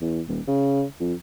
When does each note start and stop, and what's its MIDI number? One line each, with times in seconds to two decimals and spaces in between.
0.01 0.22 40
0.28 0.40 27
0.48 0.84 49
1.00 1.14 41